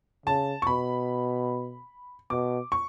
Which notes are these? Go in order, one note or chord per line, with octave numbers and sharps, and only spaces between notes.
C#3 A5
C#6
B2 B5
B2 D6
C#6